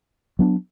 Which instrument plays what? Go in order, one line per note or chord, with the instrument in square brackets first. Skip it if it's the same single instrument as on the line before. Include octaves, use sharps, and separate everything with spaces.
[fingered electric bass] F#3 B3 D4